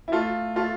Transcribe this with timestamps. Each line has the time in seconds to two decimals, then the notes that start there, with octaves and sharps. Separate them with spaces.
0.08 E4
0.12 A3 F4
0.56 A3 F4